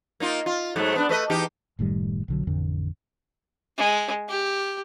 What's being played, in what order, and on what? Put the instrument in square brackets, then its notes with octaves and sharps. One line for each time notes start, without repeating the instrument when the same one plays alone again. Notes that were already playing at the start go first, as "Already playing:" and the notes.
[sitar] A#3 D#4 F4
F4
G#2 F#3 A3
B3 D4
A3 B4 D#5
E2 D#4 G4
[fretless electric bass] F#1 A2 D#3 G3
B1 D3 F#3
A1 F2 D3
[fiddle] G#3
G4